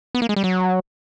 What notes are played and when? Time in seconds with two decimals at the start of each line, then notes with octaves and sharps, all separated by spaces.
0.15 B3
0.22 A#3
0.29 G#3
0.36 G3
0.44 F#3